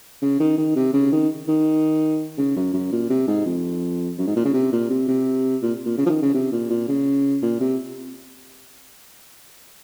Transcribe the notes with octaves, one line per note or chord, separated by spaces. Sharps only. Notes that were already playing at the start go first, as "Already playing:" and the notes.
C#3
D#3
D#3
C3
C#3
D#3
D#3
C#3
F#2
F#2
A#2
C3
G#2
F2
F#2
G#2
A#2
C#3
C3
A#2
C3
C3
A#2
A#2
C#3
F3
D#3
C#3
C3
A#2
A#2
C#3
A#2
C3